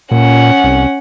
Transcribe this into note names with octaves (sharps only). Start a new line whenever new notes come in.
A#2 C#4 F#5
C2